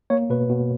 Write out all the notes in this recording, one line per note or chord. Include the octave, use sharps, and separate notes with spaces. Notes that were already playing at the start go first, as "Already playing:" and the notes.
A#3 C#5
B2 B4
B2